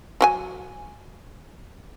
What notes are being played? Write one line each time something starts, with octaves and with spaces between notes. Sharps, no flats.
F#3 G4 G#5